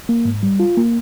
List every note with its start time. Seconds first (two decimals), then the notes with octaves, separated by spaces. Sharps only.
0.09 A#3
0.25 G#2
0.43 G3
0.60 F4
0.77 A#3